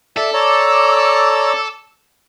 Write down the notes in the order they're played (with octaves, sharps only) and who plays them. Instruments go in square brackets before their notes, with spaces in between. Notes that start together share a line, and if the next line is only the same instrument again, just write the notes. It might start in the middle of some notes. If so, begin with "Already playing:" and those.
[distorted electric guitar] A4 [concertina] D5 E5
[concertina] C#5 D5 A#5 [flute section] D6 E6